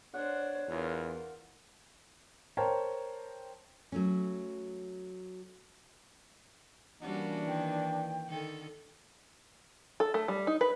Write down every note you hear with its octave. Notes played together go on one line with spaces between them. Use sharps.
D4 C5 C#5 F#5
E2 F4 A#4
A#4 C5 C#5 G5 A5 A#5
F#3 A3 C#4
E3 G3 A#3 C#4 D4 F#4 F#5
D#3 G5
D3 D#3 A4
A4
A3
G3
D#4
B4